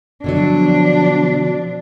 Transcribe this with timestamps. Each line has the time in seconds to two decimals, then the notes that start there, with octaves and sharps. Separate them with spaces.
0.24 B2 D3 F3 F#3 D4